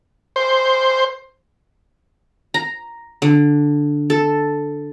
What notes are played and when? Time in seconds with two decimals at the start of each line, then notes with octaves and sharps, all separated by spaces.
0.36 C5
2.54 A#5
3.22 D3
4.10 A4